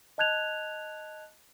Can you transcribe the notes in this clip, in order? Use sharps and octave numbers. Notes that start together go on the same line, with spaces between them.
D#5 A5 F#6 G#6 F7